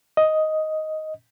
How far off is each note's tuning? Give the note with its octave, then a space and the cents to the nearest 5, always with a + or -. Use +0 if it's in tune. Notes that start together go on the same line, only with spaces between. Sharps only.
D#5 +5